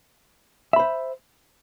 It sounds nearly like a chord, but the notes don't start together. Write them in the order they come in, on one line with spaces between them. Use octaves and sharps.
E5 B5 C5